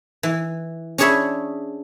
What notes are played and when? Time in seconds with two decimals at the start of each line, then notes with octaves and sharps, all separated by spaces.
0.23 E3
0.98 C#4 D4 G#4 C#5 E5 B5